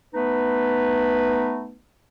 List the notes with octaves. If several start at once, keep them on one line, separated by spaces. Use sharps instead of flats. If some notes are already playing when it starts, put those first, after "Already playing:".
A3 B3 D#4 B4